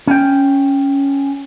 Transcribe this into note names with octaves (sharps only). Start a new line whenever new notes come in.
C#4 G5